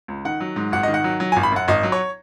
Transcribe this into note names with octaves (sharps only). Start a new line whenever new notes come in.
C#2
D#3 F#5
F#3
G#2
G#1 F#5
D#3 D#5
F#5
F#3
F#3
G#5
G#1
B5
F#2 F#5
G#1 D#5
F#3
C#5